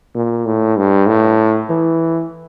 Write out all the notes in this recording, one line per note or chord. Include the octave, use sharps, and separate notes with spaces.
A#2
A2
G2
A2
E3